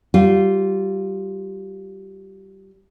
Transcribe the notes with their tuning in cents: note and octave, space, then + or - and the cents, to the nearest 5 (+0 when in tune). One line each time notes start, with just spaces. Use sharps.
G3 -25 F4 +0